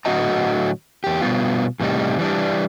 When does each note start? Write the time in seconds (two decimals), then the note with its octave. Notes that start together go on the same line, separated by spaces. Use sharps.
0.05 A2 D3 F#3 F#4 D#5 A#5
1.04 E2 G4
1.22 B2 G3 B3 F4
1.80 E2 A2 C3 G3 D#4
2.19 E3 G3 D4